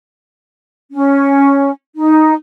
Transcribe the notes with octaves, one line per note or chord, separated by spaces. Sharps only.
C#4
D#4